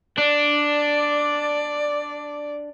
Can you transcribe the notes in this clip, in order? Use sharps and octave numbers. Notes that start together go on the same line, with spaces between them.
D4 D5